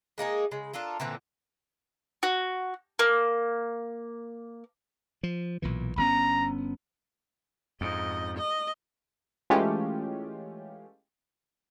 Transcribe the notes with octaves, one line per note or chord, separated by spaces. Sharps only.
G#3 A#3 D#4 G#4
C#3 G#3
D4 F4 A4 A#4
A#2 D3 E3 C4
F#4
A#3
F3
B1 A#2 E3
G1 B3 C#4 A#5
F2 G#2 D#5
D#5
E3 G#3 A3 C#4 F4 G4